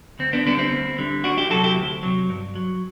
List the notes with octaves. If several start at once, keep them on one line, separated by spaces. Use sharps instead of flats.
D2 C4
B3 D4
D3 G3 B3 D4
C4 E4
D2
D3 G3
D2 D4 F#4
E4 G4
C3 F#3 F#4 A4
E4 G4
D2
C3 F#3
G2
F#3